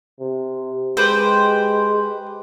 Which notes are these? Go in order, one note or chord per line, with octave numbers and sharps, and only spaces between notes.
C3
G#3 G4 B4 C5